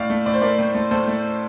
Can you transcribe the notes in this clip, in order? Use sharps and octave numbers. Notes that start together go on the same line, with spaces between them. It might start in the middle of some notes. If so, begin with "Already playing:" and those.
Already playing: A2 D5 F5
A3
A2 D5
C5
A3 A#4 D5
A2
A3
A2 A4 C5
A3